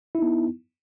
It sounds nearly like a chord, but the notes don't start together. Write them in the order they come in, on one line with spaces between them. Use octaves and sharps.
E4 D#4 B3